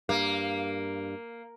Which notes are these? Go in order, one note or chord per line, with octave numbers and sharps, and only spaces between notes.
G2 A#3